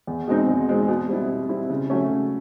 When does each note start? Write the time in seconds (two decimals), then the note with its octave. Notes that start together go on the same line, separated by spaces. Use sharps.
0.07 E2
0.28 B2 G#3 C4 D#4
0.48 E2
0.68 B2 G#3 C4 D#4
0.88 B2
1.08 G3 C4 E4
1.30 B2
1.49 G3 C4 E4
1.70 C#3
1.90 F#3 A3 C#4
2.11 C#3